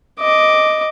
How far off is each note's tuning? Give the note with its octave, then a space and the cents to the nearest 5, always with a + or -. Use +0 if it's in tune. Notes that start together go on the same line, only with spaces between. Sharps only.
D#5 +0 D6 +0